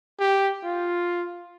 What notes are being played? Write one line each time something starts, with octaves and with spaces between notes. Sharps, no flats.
G4
F4